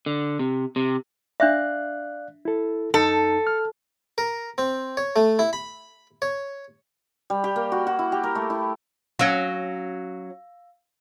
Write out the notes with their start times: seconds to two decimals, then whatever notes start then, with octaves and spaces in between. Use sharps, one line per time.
0.06 D3
0.39 C3
0.76 C3
1.40 D4 D5 E5 F5 F#6
2.45 E4 A4
2.94 F#2 D#4 A4
3.47 F6
4.18 A#4
4.58 C4
4.97 C#5
5.16 A3
5.39 E4
5.53 B5
6.22 C#5
7.30 G3
7.44 G4
7.56 A#3
7.72 F#4
7.87 F#4
7.99 E4
8.12 G4
8.24 A#4
8.35 A3
8.50 E4
9.19 F#3 C#4 F5 E6 A#6